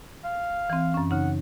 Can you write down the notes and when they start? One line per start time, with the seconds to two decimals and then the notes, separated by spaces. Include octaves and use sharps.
0.25 F5
0.70 E3 C4
0.94 F#2 C#4
1.11 C#3 D#4 F#5